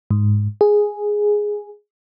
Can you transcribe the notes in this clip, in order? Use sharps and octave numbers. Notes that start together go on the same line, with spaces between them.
G#2
G#4